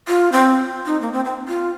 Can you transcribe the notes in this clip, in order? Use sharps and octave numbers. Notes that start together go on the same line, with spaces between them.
F4
C4
D#4
A#3
C4
C4
F4